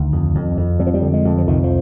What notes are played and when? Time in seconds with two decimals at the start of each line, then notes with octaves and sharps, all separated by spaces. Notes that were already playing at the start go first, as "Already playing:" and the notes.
Already playing: D2 D#3
0.12 F2
0.35 F2
0.57 F2
0.79 F2 G3
0.87 F3
0.94 G3
1.02 D3
1.14 G#3
1.25 F2
1.38 F3
1.47 C2 D#3
1.64 F3